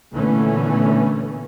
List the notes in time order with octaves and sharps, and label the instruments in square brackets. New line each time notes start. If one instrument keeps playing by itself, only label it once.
[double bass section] A#2 D3 E3 A3 B3 C#4